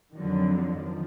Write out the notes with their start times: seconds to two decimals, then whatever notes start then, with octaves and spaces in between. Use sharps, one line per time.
0.15 F2 D3 D#3 F3 F#3
0.51 D#3 F3